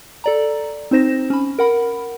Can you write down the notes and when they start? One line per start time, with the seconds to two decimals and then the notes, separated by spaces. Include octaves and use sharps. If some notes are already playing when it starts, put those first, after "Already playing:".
0.24 A4 D5 A#5
0.91 C4 D#4 C5 A#6 E7
1.30 C#4 B5
1.59 A#4 F#5 B5